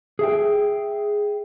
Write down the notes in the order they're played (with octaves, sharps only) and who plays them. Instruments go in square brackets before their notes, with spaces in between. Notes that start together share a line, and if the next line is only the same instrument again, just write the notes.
[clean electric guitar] G#4 E5 G5